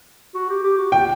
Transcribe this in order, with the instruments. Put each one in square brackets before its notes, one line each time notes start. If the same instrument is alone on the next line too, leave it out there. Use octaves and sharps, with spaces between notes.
[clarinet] F#4
G4
G4
F#4
[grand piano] G5